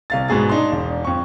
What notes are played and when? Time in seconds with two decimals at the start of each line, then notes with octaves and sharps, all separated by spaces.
0.10 C2 F5 A6
0.28 G#2 B2 G#4 A6
0.49 D4 D#4 C6
0.72 E1
1.04 F2 C#6